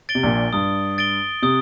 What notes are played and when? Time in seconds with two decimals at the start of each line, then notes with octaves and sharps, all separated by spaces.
0.09 A6 D7 G7
0.15 C3
0.23 A#1 A#2
0.53 G2 D#6
0.98 A6 D7 G7
1.42 C3 D#6